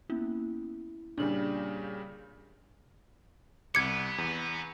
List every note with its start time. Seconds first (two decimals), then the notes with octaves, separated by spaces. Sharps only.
0.10 A#3 B3 C#4 E4
1.18 A#2 C#3 G3 D4 F#7
3.75 C2 B3 D6 G#6 C#7
4.18 E2